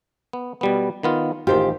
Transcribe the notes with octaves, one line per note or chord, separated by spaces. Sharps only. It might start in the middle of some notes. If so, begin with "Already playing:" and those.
B3
B2 G3 B3
D#3 B3 F4
A1 D#3 F4 G4 C5